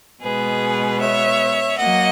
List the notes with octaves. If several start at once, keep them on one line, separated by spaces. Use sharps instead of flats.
B2 G#3 B3 G#4 B4
C#5 E5
F#3 A#3 D#5 F#5